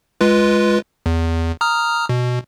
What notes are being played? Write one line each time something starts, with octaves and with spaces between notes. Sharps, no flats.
G#3 F4 B4
E2
A#5 D#6 F6
B2